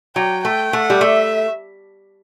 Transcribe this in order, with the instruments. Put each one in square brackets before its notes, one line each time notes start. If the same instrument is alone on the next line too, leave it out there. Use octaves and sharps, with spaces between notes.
[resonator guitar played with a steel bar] F#3 [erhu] G5
[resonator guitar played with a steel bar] A3 [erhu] G5
[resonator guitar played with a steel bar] A3 [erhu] F#5
[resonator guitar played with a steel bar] G3
[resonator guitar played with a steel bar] A3 [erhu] E5